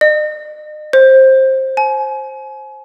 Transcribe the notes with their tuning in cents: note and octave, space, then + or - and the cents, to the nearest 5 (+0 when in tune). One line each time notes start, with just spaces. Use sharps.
D#5 -40
C5 +15
G#5 +35